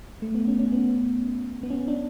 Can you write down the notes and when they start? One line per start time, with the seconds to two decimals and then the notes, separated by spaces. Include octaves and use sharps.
0.22 A3
0.35 B3
0.48 C#4
0.59 C#4
0.72 B3
1.63 B3
1.70 C#4
1.88 D4